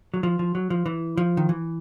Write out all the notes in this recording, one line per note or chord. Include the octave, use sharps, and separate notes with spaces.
F#3
F3
F3
F#3
F3
E3
F3
D#3
E3